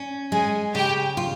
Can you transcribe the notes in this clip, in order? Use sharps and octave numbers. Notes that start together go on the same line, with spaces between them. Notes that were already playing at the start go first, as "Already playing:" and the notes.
Already playing: C#4
G#3 G#4 G#5
C#3 G4 G5
F4